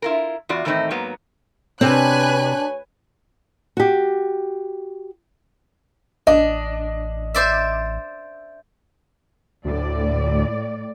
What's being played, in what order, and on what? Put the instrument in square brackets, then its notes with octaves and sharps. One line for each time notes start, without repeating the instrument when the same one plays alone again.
[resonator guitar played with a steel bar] E4 F4 A#4
E2 F4 F#4 D5
A2 D#3 E3 A3 C4 D#4
G#2 F#3 A#3 B3
[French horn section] D2 C#5 [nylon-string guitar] C3 C4 [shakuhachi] D4 [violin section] B4 G#5 F#6
[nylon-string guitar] F#4 G4
[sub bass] A1 [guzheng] D4 [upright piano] D#5
[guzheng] C5 D5 E5
[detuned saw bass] D2 [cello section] A2 D5